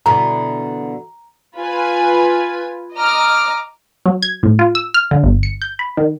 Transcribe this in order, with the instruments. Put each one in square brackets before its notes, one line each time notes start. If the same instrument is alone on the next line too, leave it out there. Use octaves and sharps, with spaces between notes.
[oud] B2 D3 E3 [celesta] A#5
[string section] F4 B4 G#5
D#5 A#5 D6 F6
[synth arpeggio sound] F#3
G#6
A2
F4
E6
F6
D3
G1
C#7
G6
B5
D#3